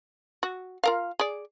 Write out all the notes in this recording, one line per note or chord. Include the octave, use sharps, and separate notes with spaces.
F#4
F4 A#4 F5
G#4 D5